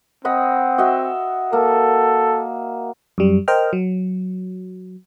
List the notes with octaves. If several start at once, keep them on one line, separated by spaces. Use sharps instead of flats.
C4 D#5 F#5 B5
F#4 D#5 E5
A#3 A4
F#2 G3
A#4 C5 D#5 G5 F6
F#3